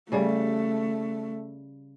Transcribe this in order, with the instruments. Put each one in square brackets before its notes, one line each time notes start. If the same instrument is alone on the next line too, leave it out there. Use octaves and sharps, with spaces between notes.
[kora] C#3 G3 [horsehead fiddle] A3